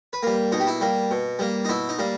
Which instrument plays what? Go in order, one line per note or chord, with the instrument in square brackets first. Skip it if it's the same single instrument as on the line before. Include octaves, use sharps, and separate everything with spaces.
[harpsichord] B4
G3 A#3
B2 D#4
G4
E4
G3 A#3
B2
G3 A#3
D#4
B2 E4
D#4
G3 A#3